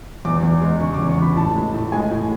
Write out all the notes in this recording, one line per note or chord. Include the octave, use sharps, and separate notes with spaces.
E2 D6
E2
G#3
C#3 C#6
E2 D6
C#6
E2 B5
A2 A5
G#3
A2
G#3 G#5
A2